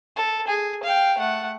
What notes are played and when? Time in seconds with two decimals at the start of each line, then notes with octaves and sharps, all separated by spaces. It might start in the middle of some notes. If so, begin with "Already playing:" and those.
0.16 A4
0.47 G#4
0.83 F5 G5
1.18 A3 F#5